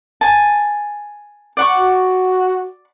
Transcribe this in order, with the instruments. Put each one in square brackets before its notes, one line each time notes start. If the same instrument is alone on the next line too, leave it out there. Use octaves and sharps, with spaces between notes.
[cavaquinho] G#5 A5
D5 F#5 C#6
[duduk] F#4